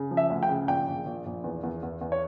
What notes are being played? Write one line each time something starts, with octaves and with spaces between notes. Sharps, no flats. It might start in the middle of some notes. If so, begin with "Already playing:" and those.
Already playing: C#3
F3
E5
D2
G5
C#3
A#1 G5
A#1
A#1
A#1
E2
E2
E2
E2
C#5